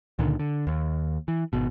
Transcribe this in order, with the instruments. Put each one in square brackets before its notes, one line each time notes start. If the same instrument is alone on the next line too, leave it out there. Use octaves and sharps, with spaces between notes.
[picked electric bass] C#2 A#2 D3 D#3
D3
D#2
E3
G#1 B2